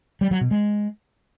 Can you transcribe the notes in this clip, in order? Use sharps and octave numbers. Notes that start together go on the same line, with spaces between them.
G3
F#3
B2
G#3